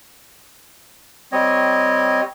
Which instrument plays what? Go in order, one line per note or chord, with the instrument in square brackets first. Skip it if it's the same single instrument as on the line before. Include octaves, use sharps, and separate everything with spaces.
[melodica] G3 C4 C#5 D#5